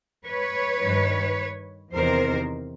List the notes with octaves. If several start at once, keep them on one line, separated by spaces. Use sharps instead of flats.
B4 C#5
G2 D#3
E2 C3 D#3 A#4 C5